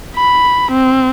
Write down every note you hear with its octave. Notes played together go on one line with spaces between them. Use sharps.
B5
C4